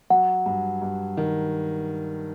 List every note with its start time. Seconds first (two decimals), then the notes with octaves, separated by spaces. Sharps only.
0.10 F#3 F#5
0.46 G2
0.82 G2
1.17 D#3